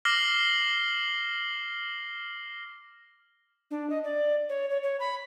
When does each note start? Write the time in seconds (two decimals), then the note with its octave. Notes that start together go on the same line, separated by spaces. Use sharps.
0.05 D6 F6 A#6 C7 F#7 G7
3.71 D4
3.90 D#5
4.04 D5
4.49 C#5
4.70 C#5
4.83 C#5
5.00 B5